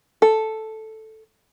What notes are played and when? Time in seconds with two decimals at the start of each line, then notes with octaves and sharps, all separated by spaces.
0.22 A4